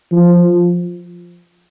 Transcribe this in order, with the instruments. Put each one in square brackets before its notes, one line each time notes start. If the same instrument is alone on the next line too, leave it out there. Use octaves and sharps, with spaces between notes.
[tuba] F3